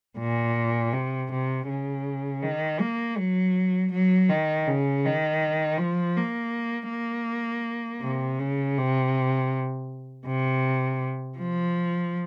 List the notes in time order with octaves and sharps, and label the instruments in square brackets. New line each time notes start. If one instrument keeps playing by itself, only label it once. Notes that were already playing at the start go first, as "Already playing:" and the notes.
[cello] A#2
C3
C3
C#3
D#3
A#3
F#3
F#3
D#3
C#3
D#3
F3
A#3
A#3
C3
C#3
C3
C3
F3